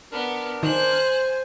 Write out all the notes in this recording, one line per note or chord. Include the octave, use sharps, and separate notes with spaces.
B3 D4 A#4
D#3 C5 G#5 F#6